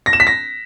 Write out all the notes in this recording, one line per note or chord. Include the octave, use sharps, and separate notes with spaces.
A#6
E7
B6
A#6